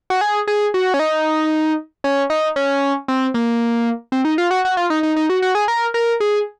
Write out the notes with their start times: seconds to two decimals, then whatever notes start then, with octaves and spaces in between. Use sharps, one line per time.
0.10 F#4
0.21 G#4
0.47 G#4
0.74 F#4
0.94 C#4
0.99 D#4
2.04 C#4
2.30 D#4
2.56 C#4
3.08 C4
3.34 A#3
4.12 C4
4.25 D#4
4.38 F4
4.51 F#4
4.65 F#4
4.77 F4
4.90 D#4
5.03 D#4
5.16 D#4
5.30 F#4
5.42 F#4
5.55 G#4
5.68 A#4
5.94 A#4
6.20 G#4